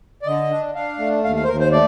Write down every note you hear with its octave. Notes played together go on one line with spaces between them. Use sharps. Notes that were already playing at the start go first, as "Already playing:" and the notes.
D5
D3 D#5
D4
D4 F5
A3
D#2 F5
F5
C5
D#2 A#4
C5
A3 D5